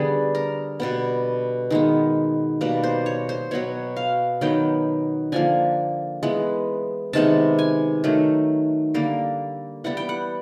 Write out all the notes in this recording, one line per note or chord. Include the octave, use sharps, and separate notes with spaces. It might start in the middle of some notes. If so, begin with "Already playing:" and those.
Already playing: D3 G3 B3 G#4
A#4
B2 G3 B3
D#3 G#3 B3
B2 G3 A#3 B4
C5
C#5
C5
B2 F#3 B3 C#5
F5
D#3 F#3 B3 G5
D3 F3 A#3 G#5
E3 G#3 B3
C3 D#3 G#3 B3 A5
G#5
D#3 F#3 A3
D3 G3 A#3
E3 G3 B3 F#5
G5
F#5